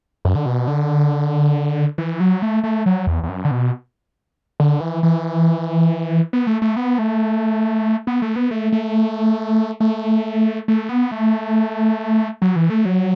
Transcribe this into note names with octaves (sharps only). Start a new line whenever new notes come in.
F#2
D3
B2
D3
E3
F#3
A3
A3
F#3
E2
E2
F#2
D3
B2
D3
E3
E3
B3
A3
A3
B3
A3
B3
A3
B3
A3
A3
A3
A3
B3
A3
F#3
E3
A3
F#3